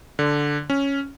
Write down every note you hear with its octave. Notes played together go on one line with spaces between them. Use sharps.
D3
C#4